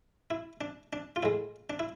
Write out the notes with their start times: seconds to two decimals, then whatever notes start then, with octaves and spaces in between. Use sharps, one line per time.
0.30 E4
0.61 D4
0.93 D4
1.16 F4
1.23 A2 G#3 E4
1.70 D4
1.79 E4